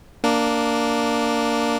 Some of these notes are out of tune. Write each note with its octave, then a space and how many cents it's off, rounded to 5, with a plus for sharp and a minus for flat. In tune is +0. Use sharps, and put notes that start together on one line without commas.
A#3 -5 D4 +0